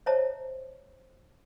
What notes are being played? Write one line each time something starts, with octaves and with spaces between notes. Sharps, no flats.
C5 C#5 D#5 E5 A5 A#5